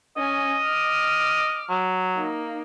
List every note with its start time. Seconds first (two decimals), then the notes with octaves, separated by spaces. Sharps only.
0.17 C#4 D#5 G#5
0.63 D6 F6
1.69 F#3
2.15 A#3 D#4